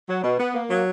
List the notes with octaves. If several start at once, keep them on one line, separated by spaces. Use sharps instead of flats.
F#3
B2
B3
A#3
F#3